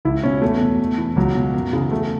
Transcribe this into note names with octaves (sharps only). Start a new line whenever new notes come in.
C#2 E4
B2 C#4
E2 A3
B2
E2
E3
C#2 F#3
B2
F#2
C#3 E3
E2 A3